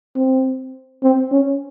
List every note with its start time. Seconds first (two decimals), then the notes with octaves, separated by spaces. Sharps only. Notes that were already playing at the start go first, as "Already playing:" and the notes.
0.16 C4
1.03 C4
1.32 C#4